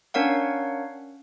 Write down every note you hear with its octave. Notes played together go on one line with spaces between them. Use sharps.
C#4 D4 A#4 C#5 F5 F#5